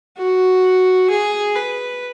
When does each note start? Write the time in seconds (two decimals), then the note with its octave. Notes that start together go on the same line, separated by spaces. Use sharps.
0.18 F#4
1.10 G#4
1.56 B4